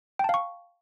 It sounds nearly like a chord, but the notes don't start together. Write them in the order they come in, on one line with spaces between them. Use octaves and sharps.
G5 A5 F5 C#6